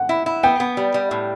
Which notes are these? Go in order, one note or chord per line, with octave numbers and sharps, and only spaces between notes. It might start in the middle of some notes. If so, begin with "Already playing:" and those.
Already playing: F#5
E4
E4
B3 G5
B3
G3
G3
A2